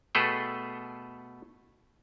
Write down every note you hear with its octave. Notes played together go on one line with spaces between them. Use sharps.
B2 A3 G#4 A4 B4 G5